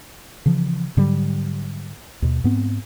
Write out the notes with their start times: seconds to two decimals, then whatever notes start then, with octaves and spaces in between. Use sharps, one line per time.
0.46 C#3 E3 F3
0.97 G#2 D3 F#3 G3
2.22 D#2 B2
2.44 G#2 B3 C4